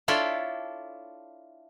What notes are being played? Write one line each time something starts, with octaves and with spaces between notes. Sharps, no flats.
D4 E4 F4 A4 C#5 D5